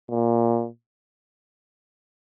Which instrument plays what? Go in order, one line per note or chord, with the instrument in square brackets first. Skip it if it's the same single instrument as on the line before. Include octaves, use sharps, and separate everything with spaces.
[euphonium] A#2